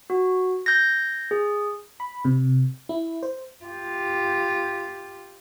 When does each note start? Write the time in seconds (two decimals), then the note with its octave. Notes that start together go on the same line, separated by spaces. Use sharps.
0.10 F#4
0.66 G6 G#6 A#6
1.31 G#4
2.00 B5
2.25 C3
2.89 E4
3.23 C5
3.65 F4 G4